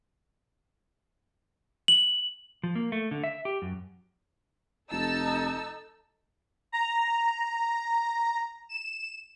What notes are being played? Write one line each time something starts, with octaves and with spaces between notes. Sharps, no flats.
F#7
F3
A#3
A3
D3
E5
G4
F#2
F1 D#4 A4 A5 E6
A#5
E7